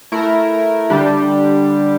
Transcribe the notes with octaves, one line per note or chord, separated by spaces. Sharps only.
A3 E4 A#4
D3 G3 D4 G4